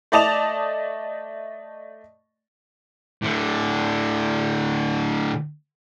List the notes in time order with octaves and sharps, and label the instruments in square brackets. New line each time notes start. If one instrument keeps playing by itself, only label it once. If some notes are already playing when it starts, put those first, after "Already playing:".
[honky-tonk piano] A3 D5 D#5 A5 E7 F7
[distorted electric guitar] A2 D3